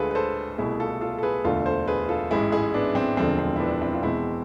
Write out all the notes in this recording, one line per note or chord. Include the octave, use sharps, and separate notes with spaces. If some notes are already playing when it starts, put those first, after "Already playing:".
Already playing: D2 D3 G#3 F4 G#4 A4 B4
B4
A4 C5
C2 B2 A3 E4 G#4
F4 A4
F4 A4
A4
G#4 B4
E1 D2 D3 A3 F4 A4
A4 C5
G#4 B4
F4 A4
A1 G#2 G#3 E4 G#4
E4 G#4
B3 D4
C4
E1 D2 D3 F3 G#3 C4
C4
E4
B3 D4
C4 E4
F4
E2 B2 G#3 C4 E4